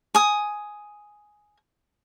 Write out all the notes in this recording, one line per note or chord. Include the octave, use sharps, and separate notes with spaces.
G#5 D#6